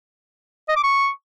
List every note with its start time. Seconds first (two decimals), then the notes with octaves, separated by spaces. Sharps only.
0.69 D#5
0.76 D6
0.84 C#6